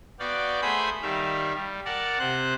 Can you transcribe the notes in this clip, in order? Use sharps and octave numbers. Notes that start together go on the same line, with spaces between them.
B3 F#4 D5 F5 G5
A3 G#4 C5 G#5 B5 G6
D#3 G3 E5 F5
G3
A#4 D5 F#5 A5
C3 C5 F#6